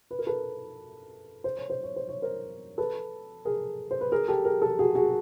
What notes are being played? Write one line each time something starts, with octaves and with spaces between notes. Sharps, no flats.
B4
A#4
A4 B4
C5
C#5
C5
C#5
C5
C#5
A#4 C5
A4 B4
G#4 A#4
C5
B4
G#4 A#4
G4 A4
G#4 A#4
G4 A4
F#4 G#4
F#4 G#4